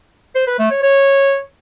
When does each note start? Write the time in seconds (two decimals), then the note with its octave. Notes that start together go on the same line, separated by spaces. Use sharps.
0.35 C5
0.47 B4
0.59 A3
0.71 C#5
0.83 C#5